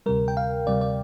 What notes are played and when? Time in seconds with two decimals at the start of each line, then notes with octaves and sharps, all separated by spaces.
0.06 D2 C3 G3 A#4
0.28 G5
0.37 F5
0.67 D2 C3 G3 D5
0.81 D5